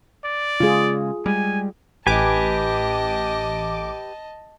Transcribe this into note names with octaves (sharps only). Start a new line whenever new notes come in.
D5
C#3 G#3 F4 G#4
G3 G#3 G#5
A1 G4 B4 D#5 G#5 A5 D6